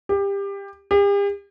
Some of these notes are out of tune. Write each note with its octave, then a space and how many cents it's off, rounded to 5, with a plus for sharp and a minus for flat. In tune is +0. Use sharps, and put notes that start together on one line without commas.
G4 +25
G4 +45